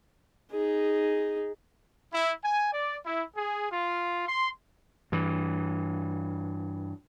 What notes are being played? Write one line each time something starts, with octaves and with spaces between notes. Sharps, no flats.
D#4 G#4
E4
G#5
D5
E4
G#4
F4
C6
G2 E3